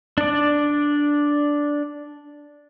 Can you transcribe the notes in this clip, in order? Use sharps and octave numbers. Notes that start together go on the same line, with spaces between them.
D4 D5